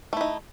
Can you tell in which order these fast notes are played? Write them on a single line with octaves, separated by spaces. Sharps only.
A3 E4 D#4